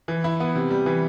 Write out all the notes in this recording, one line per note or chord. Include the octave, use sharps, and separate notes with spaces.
E3
E4
B3
C3
G3
E3